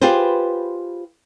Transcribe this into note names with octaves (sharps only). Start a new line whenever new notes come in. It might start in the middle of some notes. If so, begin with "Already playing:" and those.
F4 G4 G#4 B4 C5